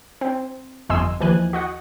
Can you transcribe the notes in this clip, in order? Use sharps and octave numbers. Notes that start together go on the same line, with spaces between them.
C4
G1 F2 D#5 G#5 C6 E6
D#2 E3 F3 G#5 F#6
F#4 D#5 F#5